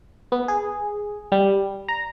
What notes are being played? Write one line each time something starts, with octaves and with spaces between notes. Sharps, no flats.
B3
G#4
G3
A#5